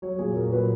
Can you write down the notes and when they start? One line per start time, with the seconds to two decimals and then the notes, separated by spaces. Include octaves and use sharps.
0.02 F#3 C#5
0.19 A#2 G#4
0.35 A#2 A#4
0.52 F#3 B4